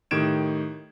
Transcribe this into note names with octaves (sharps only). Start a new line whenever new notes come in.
A2 D#3 G4 G#6 D7 E7